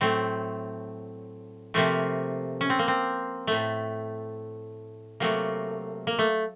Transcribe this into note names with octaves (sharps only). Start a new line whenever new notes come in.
A2 F#3 A3 C4
C3 F3 A3 A#3
C#4
C4
A#3
C4
A2 A3
C3 F#3 A3 A#3
A#3
A3